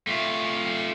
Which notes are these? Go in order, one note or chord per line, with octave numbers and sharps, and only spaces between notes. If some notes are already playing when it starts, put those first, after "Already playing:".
A3 F4